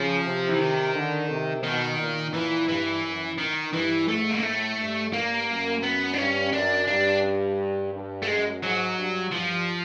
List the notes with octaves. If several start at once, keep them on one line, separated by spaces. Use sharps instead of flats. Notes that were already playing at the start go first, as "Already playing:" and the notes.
Already playing: C#3 F3
C3
E3
D#3
D3
C3
B2 D#3
A#2
E3
G2 E3
F#2
D#3
G2 E3
G#2 A3
A#3
A2 A3
G2
A#3
F#2
B3
D4
G2 C#4
F#2 D4
G2 D4
G2
A3
F#2 G#3
G#2 F#3
G2
G2 F3